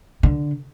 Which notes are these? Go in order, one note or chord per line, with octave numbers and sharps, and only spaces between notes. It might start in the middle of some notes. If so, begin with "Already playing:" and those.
D3